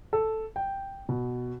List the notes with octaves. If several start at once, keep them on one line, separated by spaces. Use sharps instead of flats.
A4
G5
B2